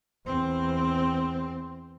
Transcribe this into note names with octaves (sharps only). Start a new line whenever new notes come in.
E2 C4